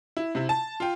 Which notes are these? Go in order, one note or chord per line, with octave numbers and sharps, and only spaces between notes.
E4
C3 E4
A5
F4 G5